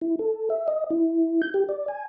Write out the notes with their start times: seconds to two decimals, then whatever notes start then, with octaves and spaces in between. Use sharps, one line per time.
0.01 E4
0.19 A4
0.50 E5
0.68 D#5
0.90 E4
1.42 G6
1.54 G4
1.69 D5
1.88 G#5